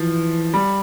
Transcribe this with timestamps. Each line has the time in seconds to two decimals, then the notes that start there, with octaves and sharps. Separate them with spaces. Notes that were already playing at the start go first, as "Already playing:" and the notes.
Already playing: E3 F3
0.54 G3